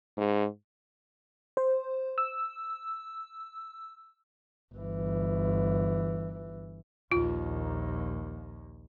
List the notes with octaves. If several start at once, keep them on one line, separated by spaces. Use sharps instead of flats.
G#2
C5
E6
G1 E3
A#1 D#2 F4